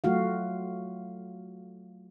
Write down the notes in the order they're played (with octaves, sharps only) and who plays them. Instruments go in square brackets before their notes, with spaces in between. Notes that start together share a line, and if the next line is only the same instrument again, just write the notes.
[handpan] F#3 A3 F4 F#4 F5